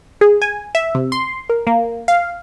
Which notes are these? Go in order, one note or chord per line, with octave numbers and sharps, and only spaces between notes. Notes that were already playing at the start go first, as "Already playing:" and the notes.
G#4
G#5
E5
C3
C6
A#4
A#3
F5